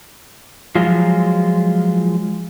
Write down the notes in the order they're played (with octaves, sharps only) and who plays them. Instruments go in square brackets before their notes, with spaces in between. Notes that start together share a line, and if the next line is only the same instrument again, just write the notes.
[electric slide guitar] F3 F#3 G#3 F4